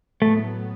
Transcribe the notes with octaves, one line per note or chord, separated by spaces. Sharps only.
A2 F#3 A3 B3